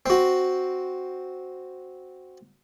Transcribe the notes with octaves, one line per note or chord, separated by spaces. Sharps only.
C4 F#4